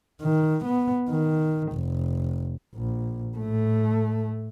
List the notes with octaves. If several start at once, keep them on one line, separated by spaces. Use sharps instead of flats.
D#3
B3
D#3
F1
A#1
A2 A3